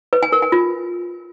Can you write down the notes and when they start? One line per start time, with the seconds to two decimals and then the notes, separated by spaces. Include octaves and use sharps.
0.13 B4
0.23 G#5
0.32 A#4
0.42 G#5
0.52 F4